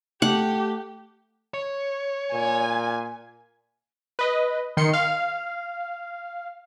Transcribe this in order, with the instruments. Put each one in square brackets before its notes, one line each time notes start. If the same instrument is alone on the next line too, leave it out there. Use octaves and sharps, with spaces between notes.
[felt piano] A3 [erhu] G4 [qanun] F#5
[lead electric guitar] C#5
[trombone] A#2 [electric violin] G#5
[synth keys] B4 D#5
D#3 C6 C#7
F5